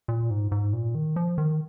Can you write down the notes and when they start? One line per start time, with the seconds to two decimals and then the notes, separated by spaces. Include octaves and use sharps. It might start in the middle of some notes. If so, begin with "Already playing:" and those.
0.08 A#2
0.30 G#2
0.52 G#2
0.73 A#2
0.95 D#3
1.16 F3
1.38 D#3